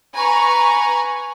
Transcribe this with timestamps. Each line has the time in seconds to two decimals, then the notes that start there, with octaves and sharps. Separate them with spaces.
0.14 B4 G#5 A#5 C#6